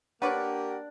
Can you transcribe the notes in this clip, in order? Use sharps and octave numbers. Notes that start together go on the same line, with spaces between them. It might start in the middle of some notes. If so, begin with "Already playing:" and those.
A#3 D4 G4 A#4 B4 C#5 D5 F#5